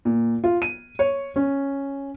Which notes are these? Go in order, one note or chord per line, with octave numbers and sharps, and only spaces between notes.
A#2
F4
D#7
C#5
C#4